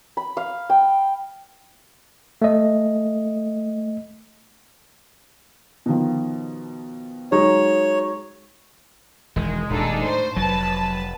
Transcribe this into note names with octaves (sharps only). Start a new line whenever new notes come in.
B5
F5
G5
A3 D#5
B2 D#3 F3
F#3 G#3 D#4 C#5
E1 D#3 G#3
D#1 D4 D#4 A4
A2 C5
F1 F#3 B4 A5